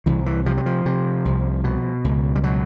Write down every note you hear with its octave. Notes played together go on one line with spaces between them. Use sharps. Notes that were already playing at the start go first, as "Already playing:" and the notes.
C2 E3
E3
C3 F3
F#3
F3
C3
C2
B2
C#2
G3
B2 F#3